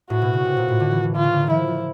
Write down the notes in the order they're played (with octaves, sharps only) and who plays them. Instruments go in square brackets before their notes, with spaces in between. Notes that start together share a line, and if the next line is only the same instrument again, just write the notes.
[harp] A2 [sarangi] F#4
[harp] B2
C#3
C3
A#2
A2
D3
E3
E3
[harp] D3 [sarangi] F4
[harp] C#3
D3
D#3
[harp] F3 [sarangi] E4
[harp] F3